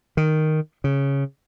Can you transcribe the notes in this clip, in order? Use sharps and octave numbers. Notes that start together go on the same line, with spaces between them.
D#3
C#3